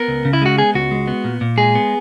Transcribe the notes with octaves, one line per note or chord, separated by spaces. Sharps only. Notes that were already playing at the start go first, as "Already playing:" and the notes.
Already playing: B3 A#4
C#2
C#3
E4
G#3 F#4
B3 G#4
C#2 F#4
G#3
B3
A#2
A#2
G#3 G#4
B3